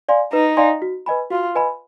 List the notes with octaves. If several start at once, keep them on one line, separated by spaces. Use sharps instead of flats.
D5 F5 G#5 C6
D#4 B4
D5 F5 G#5 C6
F#4
B4 D#5 G#5 B5
F4 F#4
B4 D#5 G#5 B5